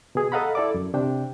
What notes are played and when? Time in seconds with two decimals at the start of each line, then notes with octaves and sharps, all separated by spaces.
0.15 B2 G#4
0.32 A4 D#5 F5 F#5 A#5 B5
0.55 E4 A4 D5 D6
0.74 F#2
0.94 C3 D4 G5